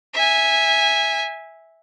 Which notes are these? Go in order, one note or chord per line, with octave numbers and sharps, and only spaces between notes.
E5 G#5